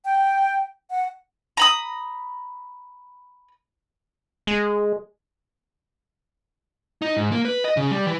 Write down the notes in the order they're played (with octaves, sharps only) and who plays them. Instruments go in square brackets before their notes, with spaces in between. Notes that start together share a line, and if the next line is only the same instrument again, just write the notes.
[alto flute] G5
F#5
[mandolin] A#5 B5 D#6
[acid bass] G#3
[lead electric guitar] D#4
G#2
A#3
B4
D#5
C#3
G3
E3